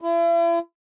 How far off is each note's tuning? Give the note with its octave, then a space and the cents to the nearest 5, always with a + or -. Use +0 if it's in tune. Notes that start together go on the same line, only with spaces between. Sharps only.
E4 +40